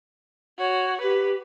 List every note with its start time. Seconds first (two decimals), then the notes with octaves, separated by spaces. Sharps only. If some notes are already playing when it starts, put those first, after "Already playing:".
0.59 F#4 C#5
1.01 G4 B4